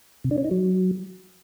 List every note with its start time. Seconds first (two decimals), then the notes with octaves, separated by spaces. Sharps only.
0.24 C3
0.31 D4
0.38 C#4
0.44 D#4
0.51 F#3